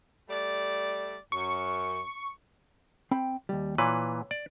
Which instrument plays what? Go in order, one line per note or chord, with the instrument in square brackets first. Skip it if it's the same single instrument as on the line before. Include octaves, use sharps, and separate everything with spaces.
[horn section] G3 A3 D5
[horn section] F#2 [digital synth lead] C#6
[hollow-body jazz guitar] C4 G5 B5
D#2 G3
[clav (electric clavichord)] A#2 E3 B4 [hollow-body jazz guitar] C#5
[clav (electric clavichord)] D5